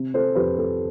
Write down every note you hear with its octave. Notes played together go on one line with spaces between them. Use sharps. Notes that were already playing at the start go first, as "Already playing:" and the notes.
Already playing: C3
A4 C5
F2 G4 B4
A4